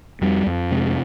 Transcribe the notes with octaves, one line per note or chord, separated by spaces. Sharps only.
F2 G3
F2
C3 G#3